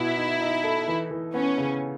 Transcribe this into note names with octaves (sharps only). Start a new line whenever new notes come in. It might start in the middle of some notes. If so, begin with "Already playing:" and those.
Already playing: B2 E4 B4
D#4
D#4
A4
E3
E3
B3 C#4
C#3